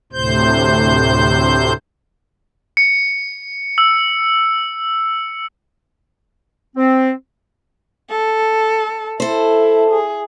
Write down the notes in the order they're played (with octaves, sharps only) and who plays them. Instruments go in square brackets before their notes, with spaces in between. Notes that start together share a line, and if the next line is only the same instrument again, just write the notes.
[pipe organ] D2 A2 C3 C5 G6
[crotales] C#7
E6
[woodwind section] C4
[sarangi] A4
[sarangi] E4 [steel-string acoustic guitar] A4 C5
[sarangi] G#4